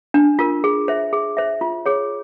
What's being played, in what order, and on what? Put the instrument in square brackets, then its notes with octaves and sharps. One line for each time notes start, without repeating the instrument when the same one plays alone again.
[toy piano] D4
F4 A#4
G#4
C5 E5
G#4
C5 E5
F4
G#4 C#5